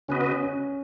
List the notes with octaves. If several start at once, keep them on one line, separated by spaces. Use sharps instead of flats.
C#3 B3 C#4 F#4 B4 D#5
C#4